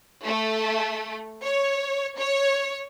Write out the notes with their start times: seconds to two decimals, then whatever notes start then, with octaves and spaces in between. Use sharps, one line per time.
0.25 A3
1.44 C#5
2.17 C#5